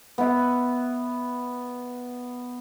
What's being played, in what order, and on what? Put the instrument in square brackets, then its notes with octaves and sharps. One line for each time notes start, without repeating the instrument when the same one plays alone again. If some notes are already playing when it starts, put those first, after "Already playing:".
[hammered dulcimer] B3 E5